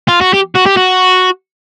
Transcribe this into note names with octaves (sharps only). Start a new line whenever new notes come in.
F4
F#4
G4
F#4
G4
F#4